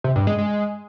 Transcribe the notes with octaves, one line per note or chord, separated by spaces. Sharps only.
C3
G2
G#3
G#3